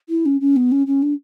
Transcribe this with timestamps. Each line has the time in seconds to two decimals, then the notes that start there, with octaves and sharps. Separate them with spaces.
0.09 E4
0.25 C#4
0.40 C#4
0.56 B3
0.71 C#4
0.86 C#4
1.02 D4